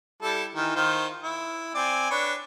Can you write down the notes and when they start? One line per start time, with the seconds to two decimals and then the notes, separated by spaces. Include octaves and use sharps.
0.23 G3 E4 A4
0.55 D#3 E3
0.76 D#3 F4 C5
1.23 E4
1.75 C4 D5 G#5
2.11 D4 B4 C#5